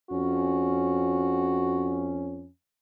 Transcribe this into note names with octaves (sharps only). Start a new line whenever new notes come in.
F2 C#4 F#4